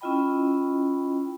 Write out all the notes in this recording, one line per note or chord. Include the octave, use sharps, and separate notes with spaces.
C#4 E4 F4 D#5 G5 B5